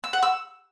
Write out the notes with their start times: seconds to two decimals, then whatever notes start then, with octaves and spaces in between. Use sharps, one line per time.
0.04 E6
0.13 F#5
0.23 E6